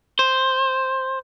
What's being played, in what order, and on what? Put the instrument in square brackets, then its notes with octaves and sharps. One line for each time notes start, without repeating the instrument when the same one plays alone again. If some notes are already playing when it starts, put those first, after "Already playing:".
[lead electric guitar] C5